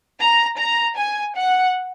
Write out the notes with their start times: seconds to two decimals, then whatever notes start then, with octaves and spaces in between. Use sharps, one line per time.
0.19 A#5
0.58 A#5
0.96 G#5
1.35 F#5